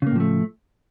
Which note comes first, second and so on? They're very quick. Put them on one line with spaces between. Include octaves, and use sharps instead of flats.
C#3 A#3 A2 F3 A3